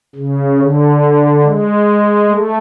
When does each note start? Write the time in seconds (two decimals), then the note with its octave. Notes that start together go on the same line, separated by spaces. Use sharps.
0.16 C#3
0.58 D3
1.43 G#3
2.28 A3